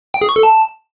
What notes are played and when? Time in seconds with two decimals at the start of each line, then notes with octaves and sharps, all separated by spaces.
0.14 G5
0.22 G#4
0.29 C#6
0.36 A4
0.43 A5